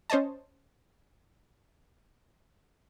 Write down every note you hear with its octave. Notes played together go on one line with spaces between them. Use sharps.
C#4 C5 C#5 D#5 A5